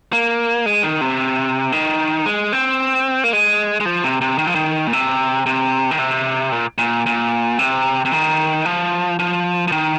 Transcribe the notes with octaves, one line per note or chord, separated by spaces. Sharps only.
A#3
G#3
D#3
C3
D#3
G#3
C4
A#3
G#3
G#3
F3
C3
C3
D#3
F3
D#3
A#2
C3
C3
D#3
C3
A#2
A#2
A#2
C3
C3
D#3
F3
F3
F3
D#3